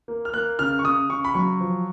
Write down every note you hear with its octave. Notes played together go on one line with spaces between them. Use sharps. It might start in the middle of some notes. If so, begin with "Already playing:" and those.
A#3
F6
A#3 F#6
C#3 F6
C#6
C#3 D#6
C#3 C#6
B5
F#3 C#6
F3